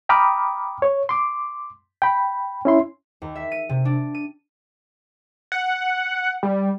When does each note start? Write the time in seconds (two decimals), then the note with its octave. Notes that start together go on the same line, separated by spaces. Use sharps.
0.09 G5 A#5 B5 D6 D#6 F6
0.82 C#5
1.09 C6 D6
2.02 G5 B5
2.65 C#4 E4 C6
3.22 D#2
3.35 E5
3.52 D#7
3.69 C3
3.85 D4
4.15 D#7
5.52 F#5
6.43 G3